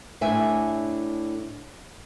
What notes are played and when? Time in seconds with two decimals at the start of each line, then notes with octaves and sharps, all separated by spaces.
0.21 A2 D4 E5 G#5